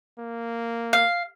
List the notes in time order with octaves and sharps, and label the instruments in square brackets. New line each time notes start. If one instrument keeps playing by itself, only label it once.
[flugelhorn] A#3
[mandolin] F5